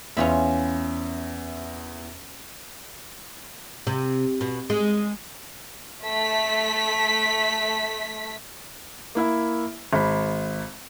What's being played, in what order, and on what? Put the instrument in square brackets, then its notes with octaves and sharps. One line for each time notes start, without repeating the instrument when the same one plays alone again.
[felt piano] E2 E5 [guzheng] C#4 F4 B5
[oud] C3
B2
G#3
[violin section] A3 B6
[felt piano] A#3 E4 E5
G#1 B5